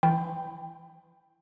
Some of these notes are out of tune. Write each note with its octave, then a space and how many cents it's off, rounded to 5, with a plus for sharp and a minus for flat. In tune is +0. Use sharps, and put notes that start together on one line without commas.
E3 +20 G5 +0 B5 +15